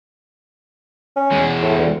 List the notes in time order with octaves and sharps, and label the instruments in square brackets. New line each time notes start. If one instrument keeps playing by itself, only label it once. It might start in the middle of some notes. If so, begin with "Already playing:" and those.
[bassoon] C#4
[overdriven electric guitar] E2 G#3
[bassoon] A2
D2